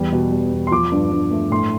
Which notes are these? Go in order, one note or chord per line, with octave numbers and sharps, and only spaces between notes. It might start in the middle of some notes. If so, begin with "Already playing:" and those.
Already playing: E2 G3
B2
G3
E2
C6
F3 D6
G2
G2
A3
A2 C6